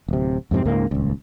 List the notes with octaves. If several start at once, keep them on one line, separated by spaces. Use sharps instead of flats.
D1 C3
F2 G#2 C3 C4
C#2 G#2 A#3
D#1 C#2